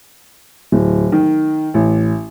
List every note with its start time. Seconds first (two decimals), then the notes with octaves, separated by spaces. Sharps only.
0.72 D1
1.12 D#3
1.74 A1